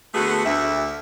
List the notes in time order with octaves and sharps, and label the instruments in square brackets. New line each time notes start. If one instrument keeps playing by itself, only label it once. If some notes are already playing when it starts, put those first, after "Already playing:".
[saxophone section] D3 A3 B3 F#4 G#4
D2 E5